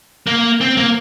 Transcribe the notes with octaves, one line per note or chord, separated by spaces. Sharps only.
A#3
C4
A#3